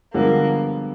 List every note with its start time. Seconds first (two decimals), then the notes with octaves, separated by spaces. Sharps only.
0.14 G2 D3 F3 G#3 A#3 B3